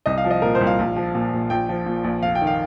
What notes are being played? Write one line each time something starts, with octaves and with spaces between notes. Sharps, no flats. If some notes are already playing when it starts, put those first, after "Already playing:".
C2 D#5
F5
F3
D#5
A#2 A#4
C5
C2
F5
A#1
F3
A#2
A#1
A#1 G5
F3
A#2
A#1
F1 F5
G5
D#3
F5